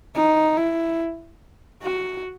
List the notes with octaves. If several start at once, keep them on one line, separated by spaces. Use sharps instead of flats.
D#4
E4
F#4